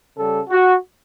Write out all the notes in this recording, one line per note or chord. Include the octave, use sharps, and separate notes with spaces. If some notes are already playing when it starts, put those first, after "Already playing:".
C#3 G3 A4
F#4